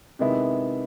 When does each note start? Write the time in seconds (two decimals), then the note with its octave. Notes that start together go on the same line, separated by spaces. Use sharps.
0.19 C3 D#3 G#3 B3 E4